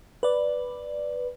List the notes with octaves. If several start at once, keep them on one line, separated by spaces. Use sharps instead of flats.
B4 D5